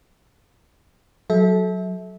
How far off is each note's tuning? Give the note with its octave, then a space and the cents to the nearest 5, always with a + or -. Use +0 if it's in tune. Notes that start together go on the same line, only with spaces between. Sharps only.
F#3 +0 A4 -25 E5 -25